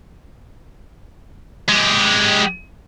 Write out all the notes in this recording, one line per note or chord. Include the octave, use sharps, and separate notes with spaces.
G#3 G4